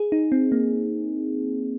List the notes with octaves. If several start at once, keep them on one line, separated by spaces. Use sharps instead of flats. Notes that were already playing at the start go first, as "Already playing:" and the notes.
Already playing: G#4
D#4
C4
A#3